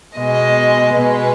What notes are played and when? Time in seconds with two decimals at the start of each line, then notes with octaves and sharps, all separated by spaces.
0.18 B2 G#3 D#5
0.94 B2 G#3 B4